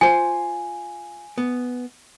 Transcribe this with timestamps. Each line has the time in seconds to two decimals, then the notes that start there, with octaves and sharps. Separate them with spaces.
0.01 F4 C5 G#5
1.38 B3